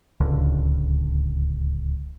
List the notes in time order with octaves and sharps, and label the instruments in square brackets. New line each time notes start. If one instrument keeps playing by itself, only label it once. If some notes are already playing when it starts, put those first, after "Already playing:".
[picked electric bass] D1 C#2 D3